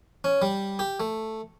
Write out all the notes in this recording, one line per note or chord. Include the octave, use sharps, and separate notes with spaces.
C#4
G3
G4
A3